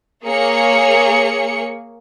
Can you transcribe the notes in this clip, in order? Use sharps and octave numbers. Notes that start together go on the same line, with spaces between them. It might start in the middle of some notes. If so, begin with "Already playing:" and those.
A#3 G#4 C#5 C#7